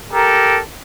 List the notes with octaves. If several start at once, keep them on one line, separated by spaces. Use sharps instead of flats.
G4 A4 A#4